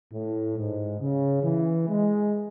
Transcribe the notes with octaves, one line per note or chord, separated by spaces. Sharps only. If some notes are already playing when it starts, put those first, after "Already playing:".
A2
G#2
C#3
E3
G#3